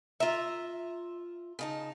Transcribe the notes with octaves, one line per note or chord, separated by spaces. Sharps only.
F4 E5 A#5
C#3 D#4 A5